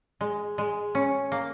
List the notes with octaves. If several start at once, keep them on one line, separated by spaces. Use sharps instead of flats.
G#3
G#3
C#4
A#3